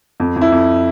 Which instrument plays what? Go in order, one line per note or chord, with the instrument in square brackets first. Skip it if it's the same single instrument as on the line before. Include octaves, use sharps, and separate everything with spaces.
[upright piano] F2
F2
E4
F2